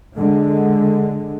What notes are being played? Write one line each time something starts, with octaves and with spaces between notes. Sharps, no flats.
D3 G#3